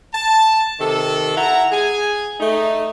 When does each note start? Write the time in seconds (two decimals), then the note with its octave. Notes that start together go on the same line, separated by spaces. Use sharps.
0.13 A5
0.79 C3 D#3 A4
1.36 E4 F#5 A#5
1.71 G#4 G#5
2.40 A3 D#4